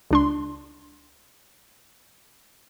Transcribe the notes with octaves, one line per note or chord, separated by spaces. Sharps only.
C#2 D4 C6